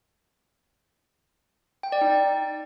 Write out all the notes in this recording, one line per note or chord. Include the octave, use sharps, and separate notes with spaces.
G5
D5
D#4